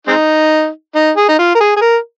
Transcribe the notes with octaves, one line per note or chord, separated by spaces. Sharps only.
G#3 C4 D#4
D#4
G#4
D#4
F4
A#4
G#4
G#4
A#4